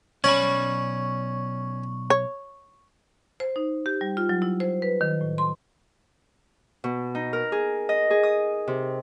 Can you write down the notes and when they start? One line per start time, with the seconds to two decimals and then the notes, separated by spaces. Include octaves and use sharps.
0.24 B1 C#4 D5 B5 C#6
2.10 C#5
3.40 C5
3.56 D#4
3.86 G4
4.01 G3
4.17 F4
4.29 F#3
4.42 E4
4.60 C5
4.82 B4
5.01 D#3
5.21 A2
5.38 C6
6.84 B2
7.15 D#4
7.33 A#4
7.52 G#4
7.89 D#5
8.11 G#4
8.23 D#6
8.67 C3